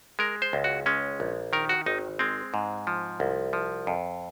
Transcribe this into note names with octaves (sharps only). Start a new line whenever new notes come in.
G#3 A#4
C5
C#2
F#4
G#3 C#4
A#1
D#3 A#4
F#4
G#1 D#4
G#3 C4
G#2
F3
C2
F3
F2